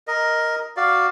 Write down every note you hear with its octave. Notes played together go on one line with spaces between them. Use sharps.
A#4 D#5
F#4 D5 F5